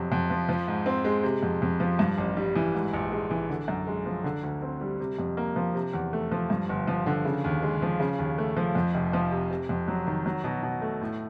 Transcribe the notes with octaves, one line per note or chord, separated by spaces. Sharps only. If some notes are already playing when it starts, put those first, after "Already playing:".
Already playing: F2 C3 F#3
F2
F3
F3
G#2
C4
G#3
C3
F2
F2
F3
G2
A1
G3
E3
G#2
A#1
G#3
E3
D3
F#2
G#3
F3
D3
D2
C4
G3
C3
F2
A#3
F3
C3
E2
A3
F3
G2
G1
F3
D3
C#3
D#2
G#3
F3
C#3
D#2
A3
F3
F2
F1
F3
C3
C3
F2
F#3
D#3
F#3
B2
B2
A3
A2